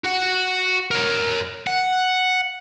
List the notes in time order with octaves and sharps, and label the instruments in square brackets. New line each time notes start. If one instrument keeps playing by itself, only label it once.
[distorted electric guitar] F#4 F#5
A#4 C#5
F#5